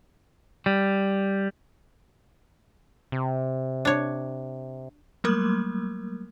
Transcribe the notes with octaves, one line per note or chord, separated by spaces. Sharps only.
G3
C3
D4 C#5
F#3 G3 A3 A#3 A#4